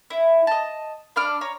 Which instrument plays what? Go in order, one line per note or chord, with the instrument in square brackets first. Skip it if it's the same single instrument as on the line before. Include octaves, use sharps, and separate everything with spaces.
[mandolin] E4
D#5 A5
D4 B5 D6 F6
C#5 A#5